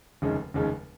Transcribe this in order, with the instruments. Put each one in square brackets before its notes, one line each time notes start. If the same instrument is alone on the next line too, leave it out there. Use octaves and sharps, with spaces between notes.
[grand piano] F1 D#2 C#3 G#3
F1 D#2 C#3 G#3